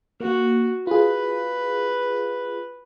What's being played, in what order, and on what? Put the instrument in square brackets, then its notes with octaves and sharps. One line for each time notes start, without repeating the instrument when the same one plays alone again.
[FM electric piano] A#3 [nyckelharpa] F#4
[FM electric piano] F4 G#4 [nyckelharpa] B4